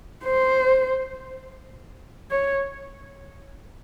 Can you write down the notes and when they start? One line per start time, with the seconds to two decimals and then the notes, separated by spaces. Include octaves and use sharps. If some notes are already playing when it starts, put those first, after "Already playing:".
0.25 C5
2.31 C#5